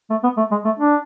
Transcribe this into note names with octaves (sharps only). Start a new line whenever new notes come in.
A3
B3
A3
G#3
A3
D4